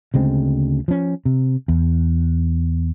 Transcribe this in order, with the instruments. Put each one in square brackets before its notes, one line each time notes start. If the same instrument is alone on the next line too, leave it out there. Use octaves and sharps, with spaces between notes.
[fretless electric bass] D2 C#3 G#3 C4
F3 C#4
C3
E2